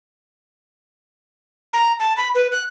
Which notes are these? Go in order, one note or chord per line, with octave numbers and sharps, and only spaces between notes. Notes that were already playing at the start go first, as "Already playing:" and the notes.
A#5
A5
B5
B4
F#6